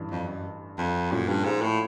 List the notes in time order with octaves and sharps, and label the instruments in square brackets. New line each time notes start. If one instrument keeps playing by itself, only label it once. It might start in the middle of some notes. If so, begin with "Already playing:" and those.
Already playing: [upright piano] A1 G2 E3
[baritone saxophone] F2
F#2
F2
[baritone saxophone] F#2 [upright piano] A#2 F3 A3 C#4
[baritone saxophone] G2
G#2
A2